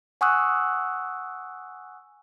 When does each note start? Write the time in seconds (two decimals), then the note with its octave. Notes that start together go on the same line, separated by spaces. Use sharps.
0.21 F#5 G#5 C#6 D#6 E6 F#6